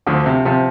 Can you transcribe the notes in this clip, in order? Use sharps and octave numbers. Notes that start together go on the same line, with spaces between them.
D2 D3 F3
C3
C3 F3